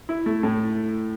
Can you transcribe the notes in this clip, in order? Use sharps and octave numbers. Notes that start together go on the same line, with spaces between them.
E4
A3
A2